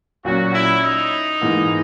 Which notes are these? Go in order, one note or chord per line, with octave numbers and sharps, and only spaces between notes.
A#2 F#3 C#4 F#4
E4
D#4
G#2 E3 A#3